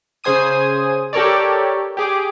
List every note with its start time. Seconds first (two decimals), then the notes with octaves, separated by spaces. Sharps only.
0.24 C#3 G#4 C5 G#5 D#6 D#7
1.13 G4 A4 A#4 C#5 D5
1.97 G4 G#4 D6